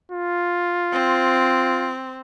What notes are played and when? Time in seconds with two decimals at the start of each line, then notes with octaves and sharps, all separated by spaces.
0.12 F4
0.92 C4